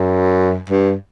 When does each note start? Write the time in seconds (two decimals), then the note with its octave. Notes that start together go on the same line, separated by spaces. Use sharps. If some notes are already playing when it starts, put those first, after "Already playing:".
Already playing: F#2
0.69 G2